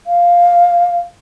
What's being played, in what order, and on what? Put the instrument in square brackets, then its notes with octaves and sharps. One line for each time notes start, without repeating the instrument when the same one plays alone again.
[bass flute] F5